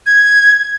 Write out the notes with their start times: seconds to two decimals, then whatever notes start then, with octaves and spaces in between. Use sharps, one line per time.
0.06 G#6